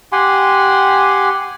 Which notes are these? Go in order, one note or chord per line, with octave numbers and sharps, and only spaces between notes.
G4 F#5 G#5 C6